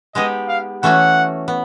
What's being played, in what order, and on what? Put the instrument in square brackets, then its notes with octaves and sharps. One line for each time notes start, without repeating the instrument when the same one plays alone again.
[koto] G#3 B3 D#4 G4 [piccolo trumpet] D#5
[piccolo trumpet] F5
[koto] E3 A3 C#4 F#4 [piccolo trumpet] F#5
[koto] B3